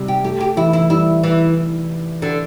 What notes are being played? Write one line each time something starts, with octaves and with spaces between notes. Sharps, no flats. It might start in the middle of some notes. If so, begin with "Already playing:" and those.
Already playing: C3 G3
G4
A3 G4
G4
E3 E4
E4
E3
G3 E4
E3
D3